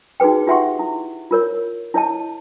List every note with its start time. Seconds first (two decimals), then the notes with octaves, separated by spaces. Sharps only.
0.20 D#4 F#4 G#4 B4 G5
0.47 F4 G4 E5 F#5 C6 C#6
0.79 E4
1.31 F4 A#4 C#5
1.94 E4 C#5 D#5 A5